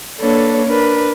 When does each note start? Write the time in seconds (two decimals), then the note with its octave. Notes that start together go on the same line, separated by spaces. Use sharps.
0.19 A#3 D4 A4 B4 C#5
0.66 D4 A#4 B4